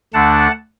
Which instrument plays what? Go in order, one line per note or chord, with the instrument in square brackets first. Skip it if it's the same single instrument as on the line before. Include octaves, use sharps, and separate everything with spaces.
[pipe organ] D2 D3 A3 D4 F#5 A5